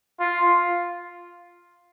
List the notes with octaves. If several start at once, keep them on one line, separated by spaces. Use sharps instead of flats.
F4